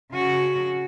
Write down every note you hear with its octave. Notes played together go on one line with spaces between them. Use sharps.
C#3 F#4